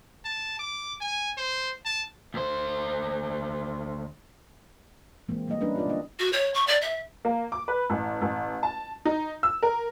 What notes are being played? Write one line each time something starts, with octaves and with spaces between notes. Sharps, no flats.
A5
D6
G#5
C5
A5
D2 C5
E3 G#3 A#3 C4
G3 A3 A#3 E4 D#5
G3 C#4 D4 E4 A#4 B4
D#4 F4 G4 B4 D5
D3 A#3 D#5
F#4
C#5
C#6
D5
E5
A#3
D6
B4
A1
A1
A5
D#4
E6
A#4